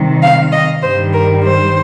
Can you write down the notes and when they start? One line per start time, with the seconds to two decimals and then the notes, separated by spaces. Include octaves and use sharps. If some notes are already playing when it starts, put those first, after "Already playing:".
Already playing: C3 D#3 G3
0.22 F5
0.52 D#5
0.82 G2 D#3 G3 C5
1.13 A#4
1.43 C5